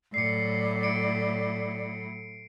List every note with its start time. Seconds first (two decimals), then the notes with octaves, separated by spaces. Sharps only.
0.14 A2 F#3 D5 C7 C#7
0.83 C#7 D7